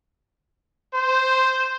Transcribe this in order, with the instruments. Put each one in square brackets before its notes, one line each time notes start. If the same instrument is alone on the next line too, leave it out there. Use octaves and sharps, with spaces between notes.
[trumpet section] C5